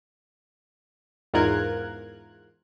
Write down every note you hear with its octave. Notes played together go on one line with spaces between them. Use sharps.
E2 G#2 F4 A#4 F#6 G#6